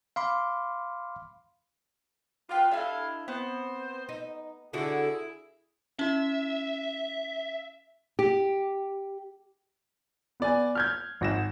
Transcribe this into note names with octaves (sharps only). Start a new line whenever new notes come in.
F5 B5 C6 D6
F4 B4 G5 D6
D4 E4 G4 A4 D#5 F5
B3 C4 C5
D#4
D3 D4 E4 F#4 G#4
C#4 E4 E5
G4
B3 D5 G#5
F6 G6 G#6
G#1 A#6 E7